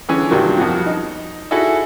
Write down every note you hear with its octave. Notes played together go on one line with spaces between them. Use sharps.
D3 E3 C#4 G#4
G2 C3 D#3 F#3 A#3
F2 B2 F#4
D#4
D#4 E4 F#4 G#4 A4 D#5